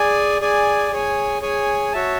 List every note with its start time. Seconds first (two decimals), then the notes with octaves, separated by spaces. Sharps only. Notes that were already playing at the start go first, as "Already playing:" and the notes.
Already playing: G#4 D5 G#5
0.41 G#4 D5 G#5
0.91 G#4 C#5 G#5
1.41 G#4 C#5 G#5
1.92 F#4 C#5 E5 A5